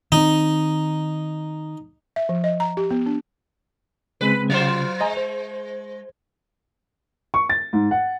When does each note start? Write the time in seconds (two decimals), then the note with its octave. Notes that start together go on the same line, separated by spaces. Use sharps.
0.12 D#3 C4 D#4
2.16 E5
2.29 F3
2.44 D#5
2.60 A#5
2.77 G4
2.91 B3
3.06 D4
4.21 C#3 G#3 C4 B4
4.50 C#3 F#3 F4 C5
5.01 G#3 D#5 G#5 A#5
5.17 C5
7.34 C#6
7.50 A6
7.73 G#2
7.91 F#5